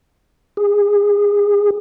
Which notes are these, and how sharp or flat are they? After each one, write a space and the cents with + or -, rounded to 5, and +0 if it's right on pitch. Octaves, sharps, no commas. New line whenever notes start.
G#4 -25